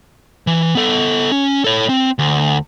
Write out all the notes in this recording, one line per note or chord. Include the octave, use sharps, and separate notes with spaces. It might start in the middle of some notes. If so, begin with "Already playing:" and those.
E3
B3 A4
C#4
A4 C#5
C4
D2